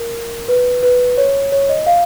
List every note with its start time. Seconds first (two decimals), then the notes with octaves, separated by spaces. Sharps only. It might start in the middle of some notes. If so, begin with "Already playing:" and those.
Already playing: A#4
0.48 B4
0.83 B4
1.17 C#5
1.52 C#5
1.69 D#5
1.86 F5